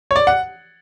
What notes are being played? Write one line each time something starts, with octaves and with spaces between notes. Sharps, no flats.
C#5
D5
F#5